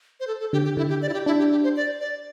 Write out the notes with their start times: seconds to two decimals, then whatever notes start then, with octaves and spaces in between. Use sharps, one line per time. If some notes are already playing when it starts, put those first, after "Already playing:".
0.20 C5
0.27 A4
0.40 A4
0.53 D3 G4
0.65 G4
0.77 D3 E4
0.89 G4
1.02 D5
1.09 E4
1.14 G4
1.26 D4 E4
1.39 G4
1.52 G4
1.64 C5
1.76 D5
2.01 D5